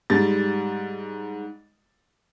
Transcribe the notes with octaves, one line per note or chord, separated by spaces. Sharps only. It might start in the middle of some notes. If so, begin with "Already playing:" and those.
G#2 G3 A6